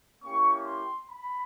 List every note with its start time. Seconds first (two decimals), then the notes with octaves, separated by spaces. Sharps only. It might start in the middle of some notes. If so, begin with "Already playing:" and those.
0.23 A#3 C#4 E4 G4 C#6
0.66 C6
1.09 B5